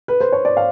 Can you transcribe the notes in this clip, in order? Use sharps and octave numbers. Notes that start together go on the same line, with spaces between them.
B4
C5
C#5
D5
F5